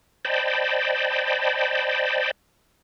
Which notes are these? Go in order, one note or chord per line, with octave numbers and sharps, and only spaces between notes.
C5 D5 D#5 G5 A5 B5